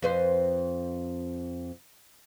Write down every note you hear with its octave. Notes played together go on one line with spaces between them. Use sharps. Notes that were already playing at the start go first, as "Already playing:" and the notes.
F2 B4 C5